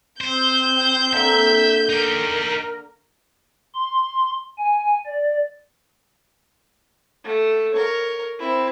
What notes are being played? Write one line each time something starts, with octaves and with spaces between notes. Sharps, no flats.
C4 C5 G6
D3 A#3 E5
D#4 G4 A#4
C6
G#5
D5
A3
A#4 C#5
C4 E4